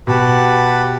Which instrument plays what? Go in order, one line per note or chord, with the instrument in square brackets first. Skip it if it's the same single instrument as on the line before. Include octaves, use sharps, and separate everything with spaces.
[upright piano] B2 [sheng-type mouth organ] G4 B4 F#5 A5